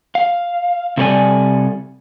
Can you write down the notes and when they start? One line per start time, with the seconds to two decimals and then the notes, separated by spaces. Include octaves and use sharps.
0.15 F5
0.97 C3 G3 A4 C#5 D5 G#5